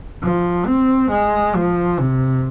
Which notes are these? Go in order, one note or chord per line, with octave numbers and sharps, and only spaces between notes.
F3
C4
G#3
F3
C3